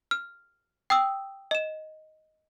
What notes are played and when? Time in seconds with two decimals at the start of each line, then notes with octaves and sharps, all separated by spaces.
0.11 F6
0.90 G5 D#6 E6
1.51 D#5 E7